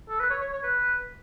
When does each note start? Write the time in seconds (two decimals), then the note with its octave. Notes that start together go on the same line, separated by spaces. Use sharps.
0.09 A4
0.20 B4
0.30 C#5
0.41 C#5
0.52 C#5
0.63 B4